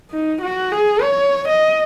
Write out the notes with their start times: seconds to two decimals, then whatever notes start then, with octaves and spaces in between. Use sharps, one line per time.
0.11 D#4
0.42 F#4
0.72 G#4
1.03 C#5
1.48 D#5